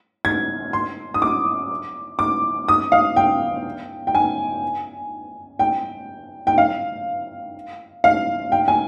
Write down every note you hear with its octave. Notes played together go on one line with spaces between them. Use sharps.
G#6
C6
D#6
D6
D6
D#6
F5
G5
G5
G#5
G5
G5
F5
F5
G5
G#5